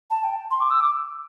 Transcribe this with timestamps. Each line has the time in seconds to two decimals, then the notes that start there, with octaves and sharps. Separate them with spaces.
0.10 A5
0.24 G5
0.51 C6
0.60 D6
0.70 E6
0.80 D6